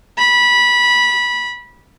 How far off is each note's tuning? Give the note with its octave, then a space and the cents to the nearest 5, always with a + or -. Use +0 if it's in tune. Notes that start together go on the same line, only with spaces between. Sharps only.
B5 -20